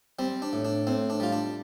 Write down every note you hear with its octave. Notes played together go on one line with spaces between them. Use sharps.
G3 C4
D4
A2
D4
A2 C4
D4
G3 F4
D4